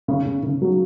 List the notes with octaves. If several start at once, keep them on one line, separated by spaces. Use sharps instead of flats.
C#3
C#3
C#3
F#3